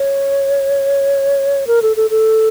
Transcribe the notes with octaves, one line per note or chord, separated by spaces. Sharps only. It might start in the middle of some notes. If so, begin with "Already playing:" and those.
Already playing: C#5
A#4
A4
A4
A4